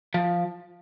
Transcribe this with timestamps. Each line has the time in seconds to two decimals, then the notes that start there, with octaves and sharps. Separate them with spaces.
0.14 F3